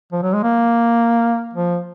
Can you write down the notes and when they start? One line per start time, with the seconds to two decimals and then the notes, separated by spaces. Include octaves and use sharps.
0.12 F3
0.22 F#3
0.33 G#3
0.43 A#3
1.53 F3